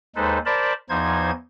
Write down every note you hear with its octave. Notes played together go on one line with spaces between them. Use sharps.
D#2 G#3 D#4 A4 B4 C5
A#4 C5 D5 A5 B5
E2 F3 D#4 C5 G#6